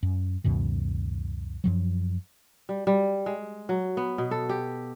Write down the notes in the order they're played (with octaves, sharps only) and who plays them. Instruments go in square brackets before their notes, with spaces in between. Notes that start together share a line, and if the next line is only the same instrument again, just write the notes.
[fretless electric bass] F#2
C#2 F#2 B2 D#3
F#2 F3 F#3
[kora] G3
G3
G#3
F#3
B3
B2
A4
G4